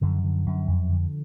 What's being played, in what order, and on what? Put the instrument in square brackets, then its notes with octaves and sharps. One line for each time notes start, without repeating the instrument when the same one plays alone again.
[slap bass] F#2 D3 F3
D3
F#2
F2
D3